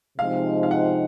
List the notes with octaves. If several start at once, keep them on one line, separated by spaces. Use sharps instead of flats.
C3 F3 G#3 C4 D#4 F5
F5
F#5